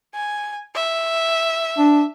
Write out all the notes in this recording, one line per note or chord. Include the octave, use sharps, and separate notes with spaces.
G#5
E5
D4